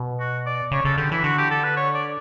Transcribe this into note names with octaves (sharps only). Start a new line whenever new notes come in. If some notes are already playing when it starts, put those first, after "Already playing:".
Already playing: B2
F#4
D5
C#3 C#5
C#3 A4
D3 G4
E3 E4
D3 F#4
G4
A4
B4
C#5
D5